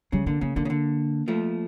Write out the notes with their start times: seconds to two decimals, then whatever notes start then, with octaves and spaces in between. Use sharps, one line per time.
0.12 C#3 G3
0.26 D3 A#3
0.41 C#3 A#3
0.56 D3 A#3
0.65 C#3
0.70 D3
1.28 F3 A3